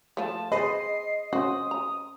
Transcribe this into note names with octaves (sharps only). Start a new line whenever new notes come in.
F3 A3 A5
G#4 B4 C5 D#5 C7
C#4 F#4 C5 D#6
A#5